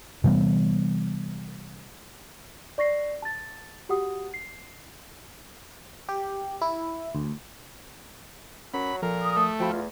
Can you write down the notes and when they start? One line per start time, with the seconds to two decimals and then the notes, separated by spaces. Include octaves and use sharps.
0.24 C3 E3 G3 B3
2.78 D5 C#6 A#6 C7
3.22 A5 A6
3.89 F#4 G4 F#5 D#6
4.34 C7
6.09 G4
6.61 E4
7.15 D2
8.74 F#3 C#4 A#4 B5
9.02 A#2 F3 A4 A#4
9.22 D#6
9.36 A3
9.60 F3 C4 F4 F#4 B5
9.72 E2 A3